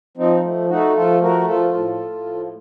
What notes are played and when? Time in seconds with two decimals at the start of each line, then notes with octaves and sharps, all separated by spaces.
0.17 F3 C4 D#4
0.43 A3
0.69 A3 D#4 F#4
0.96 F3 F4 A4
1.21 A3 F#4 A#4
1.47 F3 F4 A4
1.74 A2
2.00 A2
2.25 F3